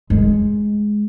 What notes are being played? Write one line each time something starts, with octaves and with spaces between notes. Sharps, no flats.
G#3